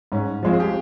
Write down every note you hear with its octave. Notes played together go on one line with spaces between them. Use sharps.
G#2 C#4
F3 G#3 C4 F4
G#4
G4